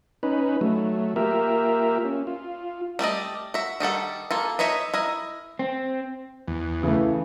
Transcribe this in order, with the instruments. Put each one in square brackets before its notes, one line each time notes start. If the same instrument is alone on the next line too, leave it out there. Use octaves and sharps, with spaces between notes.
[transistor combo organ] C#4 D#4 B4
F#3 A3
A#3 F4 G4 A#4 E5
C#4
F4
[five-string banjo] G3 A3 D5 D#5
F#4 E5
D#3 G3 A4 F#5
A#3 F4 A4
D#4 B4 C#5 D#5 E5
E4 A#4 D#5
[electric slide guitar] C4
[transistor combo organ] E2
[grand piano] C#3 A3 [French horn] E3